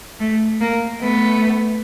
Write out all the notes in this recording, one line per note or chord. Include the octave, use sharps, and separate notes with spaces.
A3
A#3
A3 B3